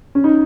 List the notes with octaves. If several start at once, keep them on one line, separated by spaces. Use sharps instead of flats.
C#4
D#4